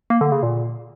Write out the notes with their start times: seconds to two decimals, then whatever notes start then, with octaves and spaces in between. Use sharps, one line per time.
0.10 A#3
0.21 D3
0.32 C#3
0.43 A#2